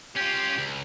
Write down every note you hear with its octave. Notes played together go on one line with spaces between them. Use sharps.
C#4 F4 G4
C#2